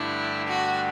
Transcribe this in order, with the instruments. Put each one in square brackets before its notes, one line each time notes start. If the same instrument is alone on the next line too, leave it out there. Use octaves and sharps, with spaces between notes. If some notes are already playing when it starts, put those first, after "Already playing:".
Already playing: [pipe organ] G2 D3 A3 D4 G4 [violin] E4
[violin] F#4